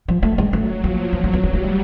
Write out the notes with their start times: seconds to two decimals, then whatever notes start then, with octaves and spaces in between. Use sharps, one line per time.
0.08 F3
0.23 A3
0.38 G#3
0.53 F#3 A3
0.83 F3 A#3
1.13 F#3 A#3
1.24 A3
1.33 B3
1.44 G3 B3
1.53 A#3
1.64 A3